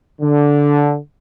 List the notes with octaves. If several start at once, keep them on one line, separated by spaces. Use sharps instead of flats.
D3